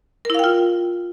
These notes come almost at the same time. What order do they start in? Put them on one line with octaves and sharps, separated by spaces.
A#4 E4 F5 G5 F4